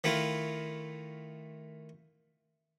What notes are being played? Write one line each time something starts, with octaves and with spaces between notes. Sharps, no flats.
D#3 A3 E4 F4